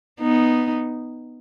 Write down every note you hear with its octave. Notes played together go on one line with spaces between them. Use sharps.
B3 D#4